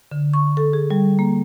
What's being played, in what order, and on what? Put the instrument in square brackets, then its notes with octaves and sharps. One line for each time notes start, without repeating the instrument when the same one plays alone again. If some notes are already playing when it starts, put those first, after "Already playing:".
[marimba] D3
C#6
A4
G#4
G3
A#3